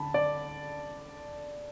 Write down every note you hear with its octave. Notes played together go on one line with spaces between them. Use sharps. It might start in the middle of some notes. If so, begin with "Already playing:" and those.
Already playing: D3 A5 B5
D5